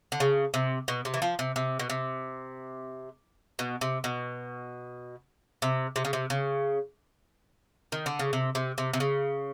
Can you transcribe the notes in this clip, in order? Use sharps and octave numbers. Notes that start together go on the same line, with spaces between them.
D3
C#3
C3
B2
C3
E3
F3
C3
C3
B2
C3
B2
C3
B2
C3
C3
C#3
C3
C#3
D#3
D3
C#3
C3
C3
C3
C3
C#3